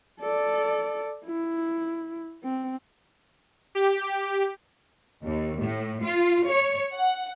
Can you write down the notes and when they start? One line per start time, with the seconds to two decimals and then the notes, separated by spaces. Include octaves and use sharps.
0.20 A4 D5
1.25 E4
2.44 C4
3.75 G4
5.24 D#2
5.60 A2
6.03 F4
6.49 C#5
6.93 F#5